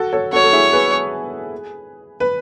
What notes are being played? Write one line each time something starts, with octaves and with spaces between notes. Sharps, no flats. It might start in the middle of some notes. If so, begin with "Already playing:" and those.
Already playing: F#4 A4
A4 C#5
F#4 A4 C#5
A4
E4 G#4
G#4 B4
B4